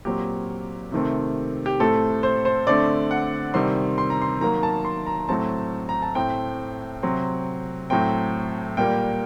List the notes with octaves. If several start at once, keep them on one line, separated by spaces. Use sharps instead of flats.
A#2 F#3 C4 G4
C3 D#3 A3 C4
G4
A2 A3 C4 A4
C5
C5
D3 A3 C4 D5
F#5
C3 D#3 G3 C4 C6
C6
A#5
C6
D#3 F#3 A#3 A#5
A5
C6
A#5
A2 F#3 A3 C4 A5
A#5
A5
A2 A3 C4 G5
C3 F#3 C4
A2 F#3 A3 C4 G5
A#2 G3 A#3 G5